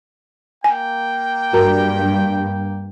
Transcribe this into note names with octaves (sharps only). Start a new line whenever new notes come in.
A#3 G5 G#5
G2 F#4 A#4 A#5